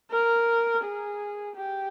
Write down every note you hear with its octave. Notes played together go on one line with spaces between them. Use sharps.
A#4
G#4
G4